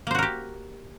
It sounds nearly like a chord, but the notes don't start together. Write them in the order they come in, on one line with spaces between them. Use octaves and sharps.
A#3 C5 F#4 A#4 G4